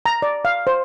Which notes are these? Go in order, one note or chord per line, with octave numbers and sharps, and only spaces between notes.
A#5
D5
F5
C5